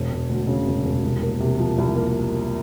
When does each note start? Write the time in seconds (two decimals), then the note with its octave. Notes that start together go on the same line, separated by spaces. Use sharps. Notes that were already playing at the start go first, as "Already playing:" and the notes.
Already playing: E1
0.12 E1
0.29 D2
0.48 C#3
0.67 E1
0.85 E1
1.03 C2
1.22 A#3
1.40 C3
1.59 F3
1.78 C2
1.96 A#3